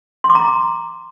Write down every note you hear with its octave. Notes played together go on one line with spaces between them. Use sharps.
C6
D6
A#5